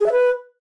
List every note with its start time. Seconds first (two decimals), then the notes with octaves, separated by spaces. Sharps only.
0.01 G#4
0.06 E5
0.12 B4